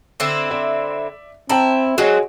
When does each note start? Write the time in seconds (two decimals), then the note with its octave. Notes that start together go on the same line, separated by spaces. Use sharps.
0.20 D3 C4 E4
0.50 D5 E5
1.50 C4 E4 G5 A5 A#5
1.98 F#3 G#3 C4 F#4 G#4 C#5 D#5